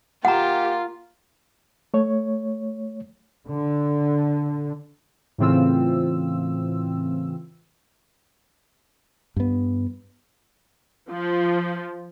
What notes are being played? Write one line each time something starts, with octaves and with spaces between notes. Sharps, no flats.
A#3 F4 G4 F#5 A#5
A3 C#5
D3
A2 C#3 E3 C4 F4 E6
G2 B3
F3